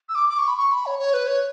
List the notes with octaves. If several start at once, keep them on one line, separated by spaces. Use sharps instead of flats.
E6
D6
D6
C#6
B5
C#6
B5
C#5
C#5
B4
C#5